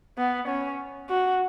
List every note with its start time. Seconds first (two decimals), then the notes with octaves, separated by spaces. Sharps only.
0.18 B3
0.48 C#4
1.09 F#4